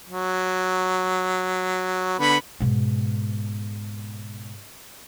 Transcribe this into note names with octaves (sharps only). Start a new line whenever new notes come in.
F#3
D3 B3 B5
G#2 B2